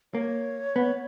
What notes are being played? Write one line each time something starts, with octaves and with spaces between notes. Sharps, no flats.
A#3 C#5
B3